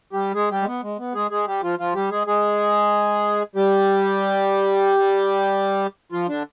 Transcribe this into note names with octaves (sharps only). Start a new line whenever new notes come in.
G3 G4
G#3 G#4
G3 G4
G#3
B3
G#3
B3
G#3 G#4
G#3 G#4
G3 G4
F3 F4
F3 F4
G3 G4
G#3 G#4
G#3 G#4
G3 G4
F3 F4
D3 D4